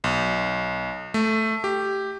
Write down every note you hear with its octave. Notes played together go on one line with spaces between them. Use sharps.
B1
A3
G4